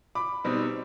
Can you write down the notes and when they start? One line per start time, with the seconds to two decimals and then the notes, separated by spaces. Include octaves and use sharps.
0.15 B5 D6
0.44 B2 G3 C4 D#4